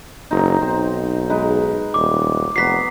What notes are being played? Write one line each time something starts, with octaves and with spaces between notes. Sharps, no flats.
F#1 D#4 C5 A#5
B1 C4
G#3 D#4 B4
D#1 D6
F1 F#3 B3 B6 C7